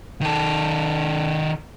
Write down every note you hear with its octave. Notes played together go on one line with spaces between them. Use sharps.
D#3 A4